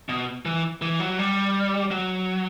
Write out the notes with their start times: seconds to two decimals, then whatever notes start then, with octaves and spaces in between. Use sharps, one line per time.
0.09 B2
0.45 E3
0.82 E3
1.00 F#3
1.19 G3
1.91 F#3